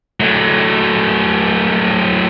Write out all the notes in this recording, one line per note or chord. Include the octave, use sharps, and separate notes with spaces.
F#3 A3